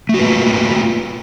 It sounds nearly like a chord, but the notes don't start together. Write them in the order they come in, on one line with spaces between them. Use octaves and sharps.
A3 F#4 B4 A#3 F4